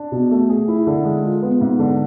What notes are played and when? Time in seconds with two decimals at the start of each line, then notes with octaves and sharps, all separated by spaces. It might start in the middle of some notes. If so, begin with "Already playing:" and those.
Already playing: D4
0.12 B2
0.31 A3
0.49 G#4
0.68 E4
0.87 D3
1.05 G#3
1.24 F4
1.42 B3
1.61 G#2
1.79 D3